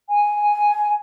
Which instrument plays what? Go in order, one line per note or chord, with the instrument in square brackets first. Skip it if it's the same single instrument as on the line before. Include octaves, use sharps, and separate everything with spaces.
[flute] G#5